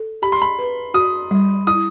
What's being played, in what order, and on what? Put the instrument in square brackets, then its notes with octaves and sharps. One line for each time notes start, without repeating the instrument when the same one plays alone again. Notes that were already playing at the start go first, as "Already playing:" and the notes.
Already playing: [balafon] A4
[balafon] G4 [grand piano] B5
[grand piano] C6
B5
[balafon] B4
[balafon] F#4 [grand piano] D#6
[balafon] G3
[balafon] E4 [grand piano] D#6